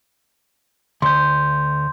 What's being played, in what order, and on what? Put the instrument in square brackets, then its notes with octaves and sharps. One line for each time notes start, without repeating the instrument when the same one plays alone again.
[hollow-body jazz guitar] D2 [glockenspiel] C6 G6